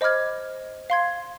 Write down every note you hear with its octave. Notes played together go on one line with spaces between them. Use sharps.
C5 D#5 B5 D6 F6 G#6
F5 C6 G#6